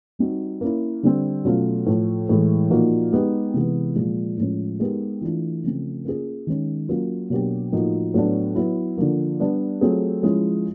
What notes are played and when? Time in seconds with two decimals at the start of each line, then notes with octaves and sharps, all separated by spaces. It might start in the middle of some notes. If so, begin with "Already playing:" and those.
0.19 G3 C4 D#4 F#4
0.61 A#3 C#4 E4
1.03 D3 G3 C4
1.45 B2 F#3 A3 C#4 F4
1.86 A2 F3 A3
2.29 A2 E3 G#3
2.70 A#2 F3 A#3 D#4 F#4
3.12 G#3 B3 D#4 G4
3.54 C3 E3 G#3 B3
3.96 A#2 F3 G#3
4.38 A2 F3 G#3 C#4
4.80 G#3 B3 D#4 G4 A#4
5.21 E3 A3 D4 F4
5.64 C#3 F3 A3 C4
6.05 A#3 C#4 F4 G#4
6.47 D#3 G#3 C#4
6.89 F#3 A#3 C#4 F4
7.30 B2 F#3 A#3 D4 G4
7.72 A2 F3 A#3 D#4 F#4
8.14 A2 F#3 B3 D4
8.55 F#3 B3 E4
8.97 D3 F3 A#3
9.39 G3 B3 D4
9.81 F#3 A3 C4 F4 G#4
10.23 F3 G#3 C#4 E4